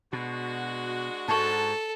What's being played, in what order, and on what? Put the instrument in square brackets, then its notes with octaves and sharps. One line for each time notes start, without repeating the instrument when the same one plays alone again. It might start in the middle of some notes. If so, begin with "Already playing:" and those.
[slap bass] B2 [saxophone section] G#3 D4 F#4
[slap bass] G#2 [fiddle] A4 [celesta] A5 C#6